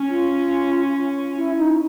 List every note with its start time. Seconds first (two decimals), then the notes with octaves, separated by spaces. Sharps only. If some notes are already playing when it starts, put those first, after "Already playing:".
Already playing: C#4
0.08 F4
1.36 E4
1.58 D#4